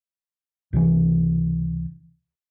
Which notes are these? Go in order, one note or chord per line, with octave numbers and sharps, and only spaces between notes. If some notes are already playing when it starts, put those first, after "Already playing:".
C#2 C3 D#3 E3